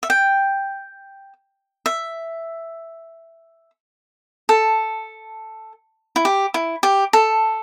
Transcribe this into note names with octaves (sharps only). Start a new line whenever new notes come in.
E5
G5
E5
A4
E4
G4
E4
G4
A4